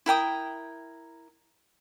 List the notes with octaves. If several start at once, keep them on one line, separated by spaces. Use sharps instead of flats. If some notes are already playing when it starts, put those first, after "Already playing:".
E4 A#4 G5 D#6